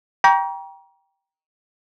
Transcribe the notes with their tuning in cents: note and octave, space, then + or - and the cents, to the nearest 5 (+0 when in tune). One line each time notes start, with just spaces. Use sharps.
G5 +0 A#5 +30 C#6 +45